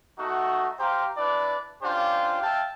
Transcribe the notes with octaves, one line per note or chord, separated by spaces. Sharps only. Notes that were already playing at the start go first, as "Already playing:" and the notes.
A3 D#4 F#4
G4 C5 F5 G5 A#5
D4 E4 B4 D5
C#4 D4 F4 G4 C5
E5 F5 G5 A5